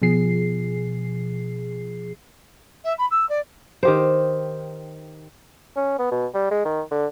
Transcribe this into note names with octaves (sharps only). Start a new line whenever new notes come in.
B2 F3 G#4 C7
E5
B5
E6
D5
D#3 G4 C5
C#4
B3
B2
G3
G#3
D#3
D3